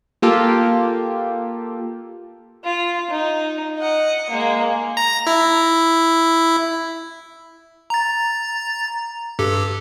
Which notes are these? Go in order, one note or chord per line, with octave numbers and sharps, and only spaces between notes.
A#3 F4 G4 A4
F4
D#4
D#5 F#5
G#3 A#3
A#5
E4
A#5 A6
G2 G4 A4